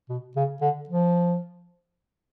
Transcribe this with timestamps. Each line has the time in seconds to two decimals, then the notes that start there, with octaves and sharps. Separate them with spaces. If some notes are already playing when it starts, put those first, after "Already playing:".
0.09 B2
0.36 C#3
0.61 D3
0.89 F3